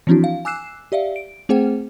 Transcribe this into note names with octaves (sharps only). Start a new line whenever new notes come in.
E3 F3 C4 D4 E4 F#4
F5
G#5 D6 E6 F#6 C7 E7
G4 D5 E5 F5
D7
A3 C4 G#4 C5 F#5 G5